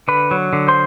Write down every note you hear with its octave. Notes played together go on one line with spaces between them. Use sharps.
D3 B4 B5
F#3
D3
C5 C6